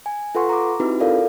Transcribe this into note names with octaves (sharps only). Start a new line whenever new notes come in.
G#5
F4 A4 B4 F#5 C6 C#6
A#5 D6
C4 D#4 E4 F#4 G4 B4
F4 A4 A#4 D5 F5